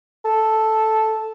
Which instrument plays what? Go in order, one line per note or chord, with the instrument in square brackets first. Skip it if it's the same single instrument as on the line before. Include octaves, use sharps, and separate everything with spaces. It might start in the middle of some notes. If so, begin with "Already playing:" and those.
[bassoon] A4